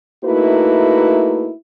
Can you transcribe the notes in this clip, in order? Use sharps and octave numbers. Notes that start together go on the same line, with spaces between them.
A3 A#3 D#4 E4 F#4 B4